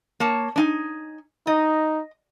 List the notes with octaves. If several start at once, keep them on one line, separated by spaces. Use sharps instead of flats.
A#3 C#5 A5
D4 D#4 G#5
D#4 D#5